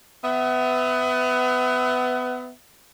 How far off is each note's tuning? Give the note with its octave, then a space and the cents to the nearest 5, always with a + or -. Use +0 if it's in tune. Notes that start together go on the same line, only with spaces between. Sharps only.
B3 +25 E5 -5